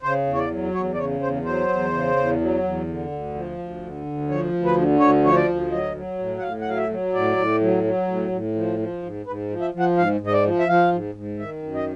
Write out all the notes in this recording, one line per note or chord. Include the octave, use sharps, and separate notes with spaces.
C#3 C5
E2
C#5
D5
F#3
E2 C#5
D5
C#3 C#5
E2 C5
F#3 C5
E2
C#3
E2
F#3
E2
D3
D2
F3
D2
D3
D2
F3 C#5
D2
B4
D3
D2 C#5
F3 C#5
D5
D2
F#3 D#5
F#3
A2
F#5
A2 F5
F#5
F#3 F5
E5
F#3
A2 D5
A2
F#3
F#3
A2
A2
F3
F3
G#2
G#2 B4
F3
E5
F3
F#5
G#2 F5
G#2
D#5
D5
F3
E5
F3 F5
G#2
G#2
D#3 E5
F#2
D#5